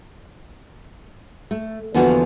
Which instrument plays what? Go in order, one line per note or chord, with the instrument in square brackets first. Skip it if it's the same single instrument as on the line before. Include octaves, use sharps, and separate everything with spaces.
[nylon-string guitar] A3
E2 D3 F3 A#3 B3 F#4